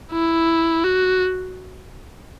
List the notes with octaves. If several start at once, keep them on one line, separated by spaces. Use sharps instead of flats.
E4
F#4